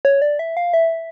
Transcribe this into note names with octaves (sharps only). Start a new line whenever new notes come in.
C#5
D5
E5
F5
E5